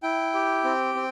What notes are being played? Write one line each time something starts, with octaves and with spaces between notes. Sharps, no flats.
E4 G5
G4
C4
C4